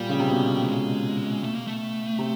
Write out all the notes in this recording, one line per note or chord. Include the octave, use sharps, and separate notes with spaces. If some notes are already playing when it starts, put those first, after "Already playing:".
Already playing: A#2 G3
C#3
C3
B2
A3
G#3
A3
A#3
A3
C3